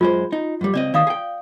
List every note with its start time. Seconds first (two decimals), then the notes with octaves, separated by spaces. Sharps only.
0.01 F#2 G#3 F4 C5
0.32 D#4
0.61 F#2 G3
0.74 C#2 C4 D5 D#5
0.94 D#2 D#3 D5 F5 D#6
1.07 G#4 G5